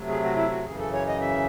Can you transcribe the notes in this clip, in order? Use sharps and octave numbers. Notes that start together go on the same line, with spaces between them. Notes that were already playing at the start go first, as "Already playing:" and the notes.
Already playing: C3 F#3 A3
G#4
F#4
E4
F#4
F#2 C#3 E3 G#4
A4
C#5
D#5
E5